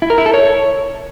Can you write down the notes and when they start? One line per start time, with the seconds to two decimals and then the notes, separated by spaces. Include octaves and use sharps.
0.02 E4
0.10 A#4
0.18 E4
0.26 A4
0.34 C#5